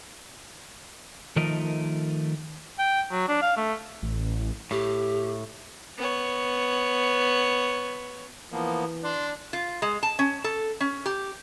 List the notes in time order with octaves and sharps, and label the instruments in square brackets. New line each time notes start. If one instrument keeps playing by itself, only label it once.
[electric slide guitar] D#3 F3 A3 A#4 D#5
[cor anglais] G5
F#3
D4
F5
A3
[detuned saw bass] A1
[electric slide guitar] A2 [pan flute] G4
[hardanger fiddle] B3 C#5
[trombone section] E3 [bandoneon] F3 A#3 B3
[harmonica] D4 [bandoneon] C6
[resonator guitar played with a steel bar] F4
G#3
A5
C#4
A4
C#4
G4